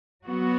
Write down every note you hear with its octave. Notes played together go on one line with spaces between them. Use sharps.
F#3 B3 F#4